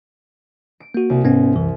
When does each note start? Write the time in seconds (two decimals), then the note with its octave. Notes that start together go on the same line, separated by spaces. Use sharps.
0.80 D7
0.94 A#3 F#4
1.10 C2
1.24 G#2 B3 C#4
1.56 C2 F#2 E3